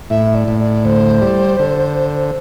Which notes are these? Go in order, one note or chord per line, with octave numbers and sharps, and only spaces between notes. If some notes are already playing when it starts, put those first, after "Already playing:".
A2 E5
D5
A2
D5
D2 C5
G3
D3